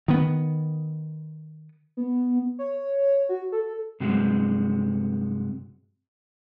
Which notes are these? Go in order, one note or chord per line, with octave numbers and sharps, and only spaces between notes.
D#3 B3
B3
C#5
F#4
A4
G2 C3 F#3 G#3